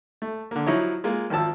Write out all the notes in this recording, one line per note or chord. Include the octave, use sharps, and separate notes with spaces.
A3
D3 A#3
F3 F#3 D#4 E4 C#5
G#3 A#3 F4
G#1 D#3 F3 A5 E6